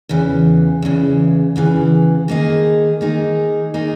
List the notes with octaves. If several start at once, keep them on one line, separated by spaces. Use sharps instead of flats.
E2 C#3 E3
E2 C#3 E3
E2 C#3 E3
D#3 A#3 D#4 G#4
D#3 A#3 D#4 G#4
D#3 A#3 D#4 G#4